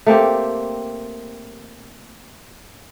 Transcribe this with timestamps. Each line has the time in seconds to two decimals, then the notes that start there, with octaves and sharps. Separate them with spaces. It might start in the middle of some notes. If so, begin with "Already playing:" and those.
0.07 A3 A#3 C4 G4